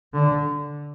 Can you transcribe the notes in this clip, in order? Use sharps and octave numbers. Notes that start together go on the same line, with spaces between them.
D3